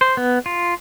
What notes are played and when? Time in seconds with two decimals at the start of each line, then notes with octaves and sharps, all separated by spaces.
0.01 C5
0.17 B3
0.46 F4